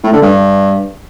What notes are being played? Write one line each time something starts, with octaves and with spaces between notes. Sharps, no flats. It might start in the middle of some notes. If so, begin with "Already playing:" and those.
A2
D3
G2